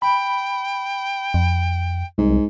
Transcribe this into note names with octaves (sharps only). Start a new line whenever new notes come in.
G5 B5
F2
C2 G#2